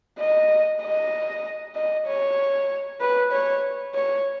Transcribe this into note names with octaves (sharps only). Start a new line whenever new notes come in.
D#5
D#5
D#5
C#5
B4
C#5
C#5